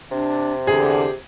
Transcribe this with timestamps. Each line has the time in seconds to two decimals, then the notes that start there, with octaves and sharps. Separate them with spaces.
0.12 C3 D4
0.67 E2 D3 G4 G#4